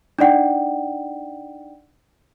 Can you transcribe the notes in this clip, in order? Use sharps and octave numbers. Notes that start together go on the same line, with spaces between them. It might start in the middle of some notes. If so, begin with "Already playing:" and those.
D4 D#4 D5 F#5 G5